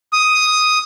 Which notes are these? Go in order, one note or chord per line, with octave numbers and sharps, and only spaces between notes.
D#6